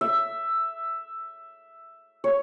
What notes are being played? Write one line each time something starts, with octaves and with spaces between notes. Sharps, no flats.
E5
C#5